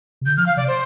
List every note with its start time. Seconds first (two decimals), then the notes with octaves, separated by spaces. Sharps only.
0.21 C3
0.26 D3 G6
0.37 F3 F6
0.46 F5
0.57 C3 D5
0.68 C5